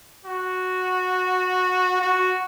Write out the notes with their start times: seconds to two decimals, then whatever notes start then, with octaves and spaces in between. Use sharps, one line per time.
0.24 F#4
2.01 F#4